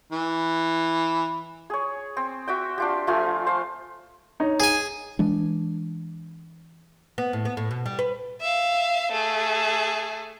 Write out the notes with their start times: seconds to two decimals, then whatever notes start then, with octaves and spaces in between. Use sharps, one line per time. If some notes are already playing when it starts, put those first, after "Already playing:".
0.12 E3
1.70 G#4 C#5
2.17 C4
2.48 F#4 E5 G5
2.78 D4 F4 G4
3.07 F3 A3 F4 G#5
3.46 C5 F5
4.40 D#4 C#5
4.60 G#4 G#5
5.19 E3 G#3 D4
7.18 B3
7.33 A2
7.45 B3
7.57 A2
7.71 B2
7.86 G3
7.99 B4
8.40 E5 F5
9.12 A3 G#4